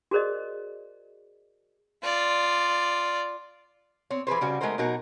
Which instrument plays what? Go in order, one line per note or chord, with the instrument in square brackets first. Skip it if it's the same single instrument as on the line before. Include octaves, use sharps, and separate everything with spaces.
[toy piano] F#4 G#4 A#4 C5 D5 D#5
[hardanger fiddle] F4 D5
[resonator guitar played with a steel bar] C4 C#5
E3 G#4 B4 C5
C#3 G3 F#4
G#3 A3 D#4 A#4 C5
B2 F#3 D#4 F#4 A#4 F#5